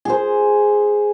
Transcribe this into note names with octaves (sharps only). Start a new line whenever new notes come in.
G#4 C5